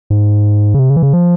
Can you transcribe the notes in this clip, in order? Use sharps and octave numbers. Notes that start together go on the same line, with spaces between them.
G#2
C#3
C3
C#3
E3
C#3
F3